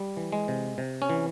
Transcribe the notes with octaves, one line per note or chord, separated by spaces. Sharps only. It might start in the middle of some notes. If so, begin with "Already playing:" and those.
Already playing: G3
E3
G#3
C3
C3
C#4
E3